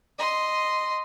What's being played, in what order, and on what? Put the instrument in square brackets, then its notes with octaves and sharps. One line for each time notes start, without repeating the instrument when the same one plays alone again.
[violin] D#5 C6